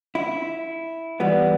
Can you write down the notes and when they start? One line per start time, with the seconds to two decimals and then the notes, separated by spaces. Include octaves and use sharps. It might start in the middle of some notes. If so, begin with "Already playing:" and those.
0.15 E4
1.20 E3 G3 B3